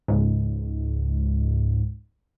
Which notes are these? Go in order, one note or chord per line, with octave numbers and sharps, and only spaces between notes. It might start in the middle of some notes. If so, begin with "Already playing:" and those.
C#2 G#2